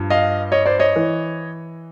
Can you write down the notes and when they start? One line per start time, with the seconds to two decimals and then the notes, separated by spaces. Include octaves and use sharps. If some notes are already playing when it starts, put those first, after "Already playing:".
Already playing: G2 F3
0.10 D#5 F5
0.52 C#5 D#5
0.66 C5 D5
0.79 C#5 D#5
0.96 E3